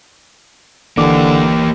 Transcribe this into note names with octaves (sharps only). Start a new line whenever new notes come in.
G1 D3 E3 A#3 G4 D6